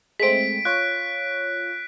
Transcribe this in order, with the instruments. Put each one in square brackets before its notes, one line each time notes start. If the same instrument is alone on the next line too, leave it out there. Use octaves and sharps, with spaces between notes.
[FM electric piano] G#3 A3 C4 [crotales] B6 D7
[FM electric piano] F4 C#5 [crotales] F#6